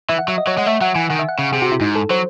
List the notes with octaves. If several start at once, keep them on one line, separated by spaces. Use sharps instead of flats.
E3 E5
F#5
F#3 E5
D#5
F#3 C#5
G#3 F#5
A3 E5
F#3 F#5
E3 G#5
D#3 F#5
E5
F#5
C#3
C3 G#4
F#4
E4
G#2 D#4
A4
F#3 C5